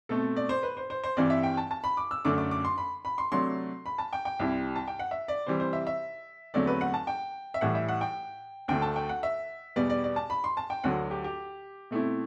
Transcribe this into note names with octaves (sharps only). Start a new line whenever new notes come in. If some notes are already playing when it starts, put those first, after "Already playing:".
B2 A3 C4 A4
D5
C5
B4
C5
C5
C5
G2 E3 G3 C4 D5
E5
G5
A5
A5
B5
D6
E6
F#2 D3 A3 D4 D6
D6
D6
C6
B5
B5
C6
C3 F#3 A3 D4 C6
B5
A5
G5
G5
C2 C3 G3 C4 E4
A5
G5
F#5
E5
D5
C3 E3 G3 C5
C5
E5
E5
E2 D3 F#3 A3 C4 D5
B4
F#5
A5
G5
E5
A2 E3 G3 F#5
E5
F#5
G5
D2 D3 A3 G5
A5
G5
F#5
E5
E2 B2 G3 B3 D5
D5
D5
A5
B5
C6
A5
G5
D2 D3 F#3 F#5
G4
G4
B2 A3 C4 E4